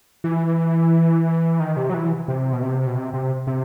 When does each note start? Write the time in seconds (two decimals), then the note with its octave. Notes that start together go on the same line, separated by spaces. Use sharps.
0.24 E3
1.60 D#3
1.77 C3
1.89 F#3
1.94 E3
2.28 C3
2.53 B2
2.62 C3
2.87 B2
2.96 C3
3.13 C3
3.47 C3